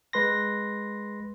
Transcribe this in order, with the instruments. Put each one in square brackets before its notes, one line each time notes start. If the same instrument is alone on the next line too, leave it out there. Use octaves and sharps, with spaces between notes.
[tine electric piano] G#3 B4 C6 A#6